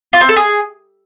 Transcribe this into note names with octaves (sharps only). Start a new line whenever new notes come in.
F4
C4
A4
G#4